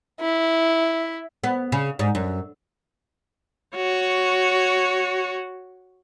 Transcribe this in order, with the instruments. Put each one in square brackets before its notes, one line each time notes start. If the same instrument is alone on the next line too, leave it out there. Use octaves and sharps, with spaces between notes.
[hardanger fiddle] E4
[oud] B3
C#3
G#2
F#2
[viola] F#4 C#5